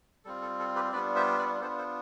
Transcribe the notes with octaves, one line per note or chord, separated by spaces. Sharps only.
G3 C4 F4 A4
A4
A4
G4 B4
G3 B3 D4 F4 B4 D5
C5 E5
B4 D5
B3 D4 F4 A4 C5
A4 C5